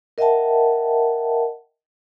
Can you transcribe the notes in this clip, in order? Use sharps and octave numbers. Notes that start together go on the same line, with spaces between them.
A#4 D#5 E5 F#5 G5 A5